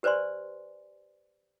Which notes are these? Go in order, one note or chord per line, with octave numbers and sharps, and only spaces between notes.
G4 B4 C5 D5 G#5 C6